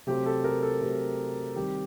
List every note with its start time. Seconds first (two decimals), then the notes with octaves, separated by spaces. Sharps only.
0.07 C3 F#3 A3 C4 G4
0.26 A4
0.44 A#4
0.63 A4
0.81 C3 F#3 A3 C4
1.56 D#3 G3 C4 G4